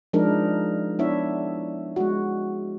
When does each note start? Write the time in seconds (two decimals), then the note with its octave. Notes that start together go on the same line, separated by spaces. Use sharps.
0.13 F3 G#3 D4 D#4 A#4
0.99 B3 D4 E4 C#5 E5
1.96 G#3 F#4